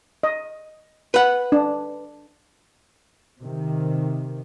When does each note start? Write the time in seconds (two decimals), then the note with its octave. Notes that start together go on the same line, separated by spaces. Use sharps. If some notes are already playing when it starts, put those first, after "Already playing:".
0.23 D#5
1.14 B4 F#5
1.52 D4
3.40 C3 D#3